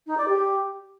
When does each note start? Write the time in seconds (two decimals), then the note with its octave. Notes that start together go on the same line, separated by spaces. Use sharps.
0.06 D#4
0.17 D5
0.28 G4